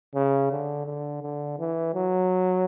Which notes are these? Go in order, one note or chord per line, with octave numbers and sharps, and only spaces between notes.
C#3
D3
D3
D3
E3
F#3